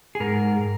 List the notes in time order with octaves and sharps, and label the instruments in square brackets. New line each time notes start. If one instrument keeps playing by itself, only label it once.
[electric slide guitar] G#4
G#2 A#4